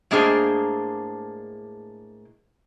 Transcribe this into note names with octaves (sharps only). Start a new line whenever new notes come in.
A2 G#3 A#3 D4 G#4 C5